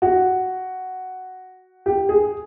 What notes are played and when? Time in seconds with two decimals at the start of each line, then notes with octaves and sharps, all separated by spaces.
0.02 F#4
1.86 G4
2.09 G#4